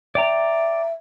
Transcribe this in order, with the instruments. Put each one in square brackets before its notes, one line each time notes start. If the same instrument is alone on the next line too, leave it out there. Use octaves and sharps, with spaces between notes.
[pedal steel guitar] D5 G5 A#5 [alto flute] E5